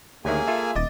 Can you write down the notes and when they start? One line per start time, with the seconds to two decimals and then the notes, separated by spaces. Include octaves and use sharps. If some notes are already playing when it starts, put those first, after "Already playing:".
0.25 D2 D#3 A#3 G4 G#4 C#5 E5 G#5
0.47 F4 A4 E5
0.76 D#1 D#5 D6 A6